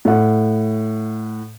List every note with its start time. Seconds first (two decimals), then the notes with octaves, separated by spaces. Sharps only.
0.05 A2 F#5